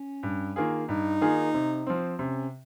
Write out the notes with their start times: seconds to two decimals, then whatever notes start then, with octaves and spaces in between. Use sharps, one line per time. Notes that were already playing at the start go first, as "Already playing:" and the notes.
Already playing: C#4
0.23 G2
0.56 D#3 A#3 F4 G#4
0.88 G2 D#4
1.21 D#3 A#3 F4 G#4
1.54 C3
1.87 F3 C4
2.19 C3 C#4